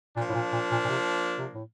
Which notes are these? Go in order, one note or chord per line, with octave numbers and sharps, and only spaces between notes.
A#2 F3 A#3 D4
A2
A#2
A#2
A#2
A#2
C3
C3
A2